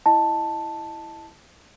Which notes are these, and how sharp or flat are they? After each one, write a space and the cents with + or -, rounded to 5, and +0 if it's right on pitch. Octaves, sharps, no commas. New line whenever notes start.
E4 +0 D#5 +0 A5 +0